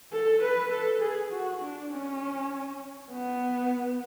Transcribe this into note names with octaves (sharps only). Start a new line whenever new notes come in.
A4
B4
A4
G#4
F#4
D4
C#4
B3